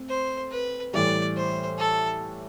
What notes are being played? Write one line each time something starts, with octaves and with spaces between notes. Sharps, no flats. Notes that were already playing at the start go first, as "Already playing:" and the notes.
Already playing: A3 C4
C5
B4
A2 E3 G3 D5
C5
A4